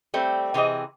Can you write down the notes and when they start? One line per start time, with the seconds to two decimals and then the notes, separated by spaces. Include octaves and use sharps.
0.14 G3 A3 C4
0.54 C3 E3 C4 G#4 D#5